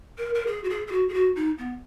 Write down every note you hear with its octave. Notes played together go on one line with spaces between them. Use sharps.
A#4
A#4
G#4
F#4
G#4
G#4
F#4
G#4
F#4
D#4
B3